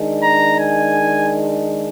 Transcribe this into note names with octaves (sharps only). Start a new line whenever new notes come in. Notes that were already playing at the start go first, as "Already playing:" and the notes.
Already playing: D#3 G#3 D4
A#5
G#5